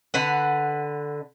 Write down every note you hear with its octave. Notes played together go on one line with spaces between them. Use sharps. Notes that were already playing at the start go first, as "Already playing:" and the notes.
D3 B4 F#5